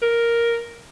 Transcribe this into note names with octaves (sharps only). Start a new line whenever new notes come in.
A#4